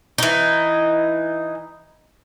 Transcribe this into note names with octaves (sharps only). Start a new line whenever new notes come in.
E3 D#4